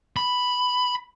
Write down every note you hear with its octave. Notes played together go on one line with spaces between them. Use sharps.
B5